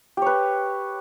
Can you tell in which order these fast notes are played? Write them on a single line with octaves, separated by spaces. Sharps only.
G4 C#5 B4